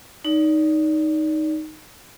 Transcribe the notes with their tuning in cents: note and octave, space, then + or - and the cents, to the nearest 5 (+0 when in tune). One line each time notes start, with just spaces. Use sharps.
D#4 +0 D5 -30